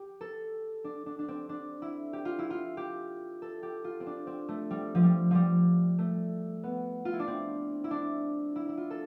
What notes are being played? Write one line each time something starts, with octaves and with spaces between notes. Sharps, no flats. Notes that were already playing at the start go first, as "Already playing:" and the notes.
Already playing: G4
A4
D4
D4
D4
C4
D4
E4
G4
F4
E4
F4
G4
A4
G4
F4
C4
D4
C4
A3
G3
F3
G3
F3 G3
A3
B3
F4
E4
D4
C4
E4
D4
E4
E4
F4
A4